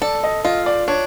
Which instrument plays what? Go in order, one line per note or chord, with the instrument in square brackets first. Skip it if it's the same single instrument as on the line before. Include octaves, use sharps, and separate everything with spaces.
[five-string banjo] A4 [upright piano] D5
[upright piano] D#5
[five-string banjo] F4 [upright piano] D#5
[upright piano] D5
[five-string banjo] D4 [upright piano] C#5